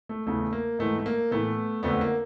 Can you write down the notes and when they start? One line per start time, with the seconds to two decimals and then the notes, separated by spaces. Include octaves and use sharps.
0.09 A3
0.27 E2 C#3 E3 A3
0.53 A#3
0.79 G#2 E3 A3
0.99 A3
1.06 A#3
1.31 A2 E3 A3 B3
1.83 F2 D3 F3 A3 B3
2.01 A#3